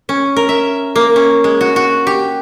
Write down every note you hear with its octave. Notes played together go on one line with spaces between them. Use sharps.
C#4
A#4
E5
A#3
C#4
G#3
F#4
F#4
G4